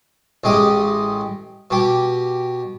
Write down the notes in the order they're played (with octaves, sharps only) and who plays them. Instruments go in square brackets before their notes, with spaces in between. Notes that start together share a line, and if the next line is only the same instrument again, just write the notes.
[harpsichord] A1 G#3 G4 D#5
B2 G4